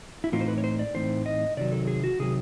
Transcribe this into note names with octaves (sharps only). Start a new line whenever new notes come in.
E4
A2 E3 A3 C4 D#4 F4
C5
B4
C#5
C5
D5
A2 E3 A3 C4 D#4 C5
D#5
C3 D#3 F#3 D5
A4
G#4
F#4
C3 D#3 F#3 G#4